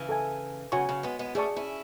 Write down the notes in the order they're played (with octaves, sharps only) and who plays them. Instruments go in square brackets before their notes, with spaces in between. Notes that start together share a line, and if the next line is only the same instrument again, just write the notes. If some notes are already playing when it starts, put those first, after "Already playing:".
Already playing: [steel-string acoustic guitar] C#3 E3
[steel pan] A4 E5 G#5
[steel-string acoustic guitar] C#3 [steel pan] F#4 C#5 G#5 C#6
[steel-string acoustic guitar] C#3
G#3 B3
G#3 B3
[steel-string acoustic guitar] A3 C#4 [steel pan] G#4 D5 A5 C#6
[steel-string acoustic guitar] C#4 E4